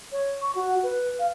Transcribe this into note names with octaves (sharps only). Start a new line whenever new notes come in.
C#5
C#6
F#4
B4
F5